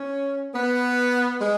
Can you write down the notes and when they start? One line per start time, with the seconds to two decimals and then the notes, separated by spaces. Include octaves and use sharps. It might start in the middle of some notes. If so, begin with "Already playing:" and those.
Already playing: C#4
0.54 B3
1.40 G#3